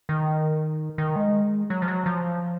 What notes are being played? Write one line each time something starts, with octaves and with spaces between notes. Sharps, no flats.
D#3
D#3
G#3
F#3
F3
F#3
F3